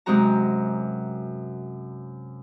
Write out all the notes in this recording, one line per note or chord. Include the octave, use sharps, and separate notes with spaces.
F#2 C3 G#3 C4 F#4 A#5